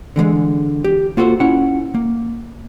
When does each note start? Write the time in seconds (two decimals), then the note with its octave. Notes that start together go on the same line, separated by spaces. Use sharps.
0.16 D3 E3 F3 G#3
0.84 G4
1.17 A#3 F4 F#4 G#4 A4 C5
1.40 C#4 E4 F#5
1.95 A#3